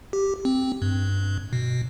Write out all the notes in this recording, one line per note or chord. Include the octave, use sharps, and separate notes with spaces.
G4
C4
G2
B2